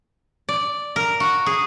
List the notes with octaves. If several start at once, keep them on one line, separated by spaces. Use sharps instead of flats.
D5
A#4
F#4
G#4